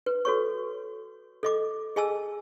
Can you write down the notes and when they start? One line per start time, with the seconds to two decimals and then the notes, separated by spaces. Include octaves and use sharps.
0.06 B4
0.25 F#4 A4 C#5 C#6
1.43 A4 D#5 D6
1.96 G#4 D#5 G#5 A5 E6